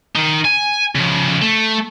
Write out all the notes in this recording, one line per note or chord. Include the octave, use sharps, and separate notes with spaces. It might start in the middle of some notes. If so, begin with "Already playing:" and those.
D#3 D#4
G#5
C#3 F3
A3